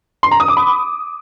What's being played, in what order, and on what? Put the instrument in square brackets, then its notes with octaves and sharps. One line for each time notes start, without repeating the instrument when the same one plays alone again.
[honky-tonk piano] C6
A#5
D#6
D6
B5